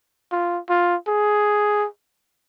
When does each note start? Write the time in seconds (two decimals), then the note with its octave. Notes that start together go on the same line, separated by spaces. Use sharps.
0.32 F4
0.69 F4
1.07 G#4